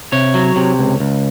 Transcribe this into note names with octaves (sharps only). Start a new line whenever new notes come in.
C3 C#5
F#3
C3
C#2
C#2